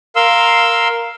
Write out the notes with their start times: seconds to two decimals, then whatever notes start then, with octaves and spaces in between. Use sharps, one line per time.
0.16 A#4 F5 C6 E6